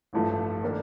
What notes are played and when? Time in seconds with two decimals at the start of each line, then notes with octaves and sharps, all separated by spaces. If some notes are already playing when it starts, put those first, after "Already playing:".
0.13 A1 G2 F3 A3
0.63 D#3 A#3 D4 A4